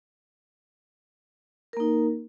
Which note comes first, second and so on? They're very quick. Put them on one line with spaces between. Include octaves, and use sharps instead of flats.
A#4 A#3 D#4